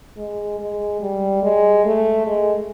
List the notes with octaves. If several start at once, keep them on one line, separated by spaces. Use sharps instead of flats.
G#3
G#3
G3
G#3
A3
G#3